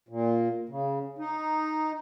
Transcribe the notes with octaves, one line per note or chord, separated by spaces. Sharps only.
A#2
C#3
D#4